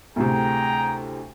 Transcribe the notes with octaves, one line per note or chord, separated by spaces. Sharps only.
D2 A2 C3 G#4 G5 A#5